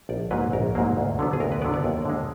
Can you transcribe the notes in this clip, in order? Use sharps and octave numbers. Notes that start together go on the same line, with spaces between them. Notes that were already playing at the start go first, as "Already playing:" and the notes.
A#1 D5
G#2 F#3 A#3 B4
A#1 A#4
G#2 F#3 A#3
D2
D3 F#3 B3
G#4
D2 A#4
B4
D3 F#3 B3 D5
D5
D#2
D3 G#3